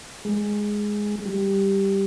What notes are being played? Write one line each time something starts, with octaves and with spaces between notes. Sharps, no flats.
G#3
G3